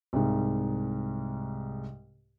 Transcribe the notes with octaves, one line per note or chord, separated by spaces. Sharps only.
C2 G#2